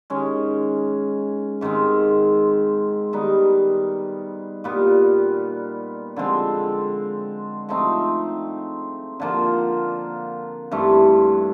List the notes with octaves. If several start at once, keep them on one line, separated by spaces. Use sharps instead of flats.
D#3 G#3 C#4
G#2 D#3 G#3 C4
D#3 G3 B3 D#4
A#2 G3 B3
D3 F3 G#3 C4
F3 A3 C4 D#4
D3 F3 A#3
G2 E3 A3 C4